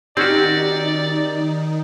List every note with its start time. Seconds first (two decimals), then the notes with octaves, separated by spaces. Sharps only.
0.17 D#3 C4 C#4 D#4 F#4 G4 D5